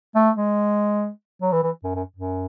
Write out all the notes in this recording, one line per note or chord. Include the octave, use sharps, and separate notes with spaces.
A3
G#3
F#3
E3
E3
F#2
F#2
F#2